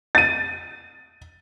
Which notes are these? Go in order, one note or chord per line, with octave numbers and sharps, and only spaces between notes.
A6 D#7